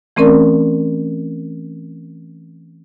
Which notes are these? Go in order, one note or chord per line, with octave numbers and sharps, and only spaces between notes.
E3 A3 C4 C#4 A#4 D5